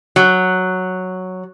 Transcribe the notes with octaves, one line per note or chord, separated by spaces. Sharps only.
F#3